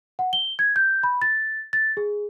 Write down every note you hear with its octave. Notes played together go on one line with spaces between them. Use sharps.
F#5
G7
G#6
G6
B5
A6
A6
G#4